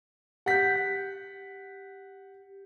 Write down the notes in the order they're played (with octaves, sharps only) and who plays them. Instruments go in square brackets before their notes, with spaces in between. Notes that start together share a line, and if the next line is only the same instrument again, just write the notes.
[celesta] G4 G6 [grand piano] F#5 B6